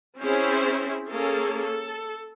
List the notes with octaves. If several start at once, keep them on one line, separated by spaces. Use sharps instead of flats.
C4 C#4 E4 G#4 C5
A#3 C#4 G#4 A4
A4